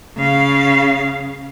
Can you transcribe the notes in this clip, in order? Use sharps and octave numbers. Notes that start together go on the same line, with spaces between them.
C#3 F5